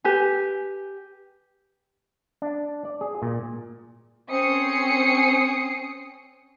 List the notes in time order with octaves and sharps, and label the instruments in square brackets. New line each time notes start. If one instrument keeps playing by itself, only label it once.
[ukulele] G4 B4 G#5
[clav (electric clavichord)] D4
D5
G#4
A#2
[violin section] C4 C#4 D#6 C7 C#7